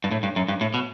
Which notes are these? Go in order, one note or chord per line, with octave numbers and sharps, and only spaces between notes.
G2
A2
G2
F#2
G2
A2
B2